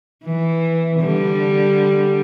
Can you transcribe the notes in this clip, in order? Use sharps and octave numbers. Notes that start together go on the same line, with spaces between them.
E3
D3 G3